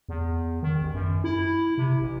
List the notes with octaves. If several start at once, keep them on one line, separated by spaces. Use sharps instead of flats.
E2
D#3
A1
F#2
E4
C3
A1